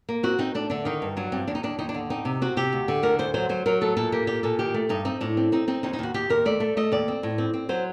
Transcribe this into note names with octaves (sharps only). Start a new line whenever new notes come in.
A#3
C4 F#4
C4 D#4
A3 D4
D3 D4
D#3 D#4
G2
F#3 D4
G2 C4
D#2 D4
D#4
D#2 D4
D#2 D#4
D4
D3
C4 D#4
C3
C4 F#4
C3 G4
D2
D3
D2 A#4
D2 C5
F#3 C5
F#3 C5
F#3 A#4
A3 A4
A#2 A4
A#3 G4
A#2 G4
A#2 A4
D#3 G4
A3
G2 D#4
C4 D#4
A2 D4
C4
C4 D#4
C4 D#4
D#2 D#4
D#4
D#2 F#4
D#2 G4
D#2 A#4
A3 D5
A3
A3 D#5
D#2 D5
C4
A2
C4
C4
F#3 C5